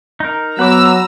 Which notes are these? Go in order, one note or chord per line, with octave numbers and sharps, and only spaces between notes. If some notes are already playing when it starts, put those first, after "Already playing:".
D#4 A#4
F#3 B3 F#5 A#5 B5 D6 E6